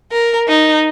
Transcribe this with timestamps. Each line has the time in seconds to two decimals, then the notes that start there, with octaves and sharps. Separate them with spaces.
0.12 A#4
0.48 D#4